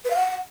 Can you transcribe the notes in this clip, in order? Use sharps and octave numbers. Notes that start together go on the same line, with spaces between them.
B4
F5
F#5